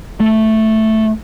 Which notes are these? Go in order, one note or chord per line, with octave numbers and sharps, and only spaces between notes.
A3